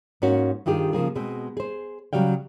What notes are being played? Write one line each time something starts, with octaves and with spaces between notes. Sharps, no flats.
G#2 A#3 C#4 F#4
G2 D#3 F4 G4 G#4
C#3 F3 A#3 G#4
B2 G#3 C4
G#4 C5
C#3 F#3 G3 F5 G5